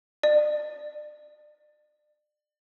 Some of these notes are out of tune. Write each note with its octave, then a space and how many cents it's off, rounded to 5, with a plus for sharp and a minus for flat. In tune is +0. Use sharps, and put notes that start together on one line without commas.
D5 +35